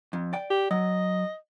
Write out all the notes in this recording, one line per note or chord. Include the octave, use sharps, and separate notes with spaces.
F2
D5 G5
G4
F#3 D#5